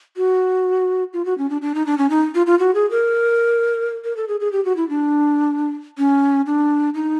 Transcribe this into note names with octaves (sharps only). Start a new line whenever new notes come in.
F#4
F4
F#4
C#4
D4
D4
D#4
D4
C#4
D#4
F4
F4
F#4
G#4
A#4
A#4
A4
G#4
G#4
G4
F#4
E4
D4
C#4
D4
D#4